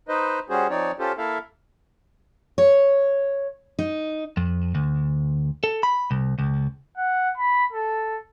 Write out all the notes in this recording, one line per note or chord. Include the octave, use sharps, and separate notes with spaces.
D#4 B4 C5 D#5
G3 C#4 F#4 G#4 C5
F3 C4 D#4 C#5 D5
C#4 F4 G4 A4 C5
A#3 E4 A4 E5 F5
C#5
D#4
F2
D2
A4
B5
C2
C#2
F#5
B5
A4